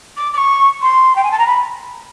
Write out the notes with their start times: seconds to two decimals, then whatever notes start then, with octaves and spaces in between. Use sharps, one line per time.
0.17 D6
0.33 D6
0.37 C#6
0.82 C6
1.16 G5
1.23 G#5
1.31 A5
1.39 A#5
1.46 B5